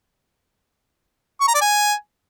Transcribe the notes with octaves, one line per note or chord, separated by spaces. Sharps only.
C#6
A#5
D5
G#5